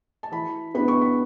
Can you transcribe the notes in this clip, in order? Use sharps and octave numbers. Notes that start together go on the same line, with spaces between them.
A5
E3 B5
B3 D4 B5
C#6
B5